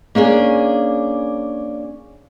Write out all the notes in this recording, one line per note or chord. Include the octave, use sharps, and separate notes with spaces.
A#3 C#4 D4 G#4